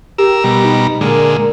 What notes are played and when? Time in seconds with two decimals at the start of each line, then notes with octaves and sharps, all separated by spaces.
0.18 G4 A#4 E6
0.44 B2 G3 A#5
0.65 D#4
1.01 A#2 D3 G#3 A#4